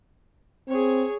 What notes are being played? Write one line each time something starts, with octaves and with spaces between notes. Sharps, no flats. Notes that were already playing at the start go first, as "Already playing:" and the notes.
C4 G#4 C#5